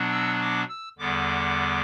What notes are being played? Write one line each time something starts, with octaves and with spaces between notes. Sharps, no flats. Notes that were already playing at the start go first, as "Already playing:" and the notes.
Already playing: B2 F#3 B3 D4
E6
D6
E6
E2 D3 G3 B3 D6